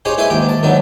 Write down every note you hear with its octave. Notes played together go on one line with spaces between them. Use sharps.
D#4 G4 G#4 C5 C#5
E4 B4 C5 G#5 B5 C6
D#2 G#2 G4 G5
A5
G#2 D3 D#3 F#3 B3